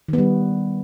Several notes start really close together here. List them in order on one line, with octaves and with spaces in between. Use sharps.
D#3 B3 G3